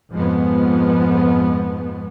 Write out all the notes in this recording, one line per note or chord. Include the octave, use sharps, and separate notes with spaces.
F2 G#2 F3 G#3 B3